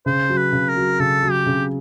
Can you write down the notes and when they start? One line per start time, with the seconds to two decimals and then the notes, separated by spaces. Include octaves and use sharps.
0.06 C#3 C5
0.30 F#3
0.37 B4
0.53 C#3
0.69 A#4
0.76 F#3
1.00 C#3 A4
1.23 F#3
1.31 G4
1.46 C#3